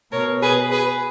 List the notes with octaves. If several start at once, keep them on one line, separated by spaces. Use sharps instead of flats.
B2 A#4 C#5
G#4 B4
G#4 B4